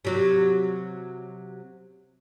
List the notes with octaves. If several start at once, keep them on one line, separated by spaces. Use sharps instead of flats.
C3 F#3